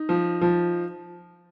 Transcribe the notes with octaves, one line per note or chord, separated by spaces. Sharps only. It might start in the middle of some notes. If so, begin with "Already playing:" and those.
Already playing: D#4
F3
F3